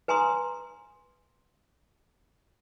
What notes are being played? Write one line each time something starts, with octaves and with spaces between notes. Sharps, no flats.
B4 G#5 A#5 C6 D#6